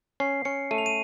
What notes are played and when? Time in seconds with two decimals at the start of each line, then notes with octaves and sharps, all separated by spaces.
0.20 C#4 C7
0.45 C#4 C#7
0.71 A3 D#7
0.78 F7
0.86 D#7